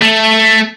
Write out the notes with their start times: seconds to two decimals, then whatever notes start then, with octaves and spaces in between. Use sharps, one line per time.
0.01 A3